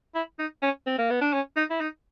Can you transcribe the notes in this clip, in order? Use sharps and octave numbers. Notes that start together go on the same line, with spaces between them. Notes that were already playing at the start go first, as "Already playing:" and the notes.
E4
D#4
C#4
C4
A#3
B3
D4
C#4
D#4
E4
D#4